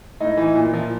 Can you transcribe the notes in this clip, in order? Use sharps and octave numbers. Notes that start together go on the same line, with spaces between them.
A2 D#4
E3
A#2
F3